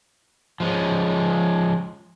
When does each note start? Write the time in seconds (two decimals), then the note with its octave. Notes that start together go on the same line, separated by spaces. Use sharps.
0.60 F3 G#3 C#4